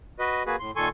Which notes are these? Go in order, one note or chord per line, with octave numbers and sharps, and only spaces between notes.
F#4 B4 D#5
A#3 F#4 G#4 B4
A2 C6
A#2 D#3 A4 G#5 C6 C#6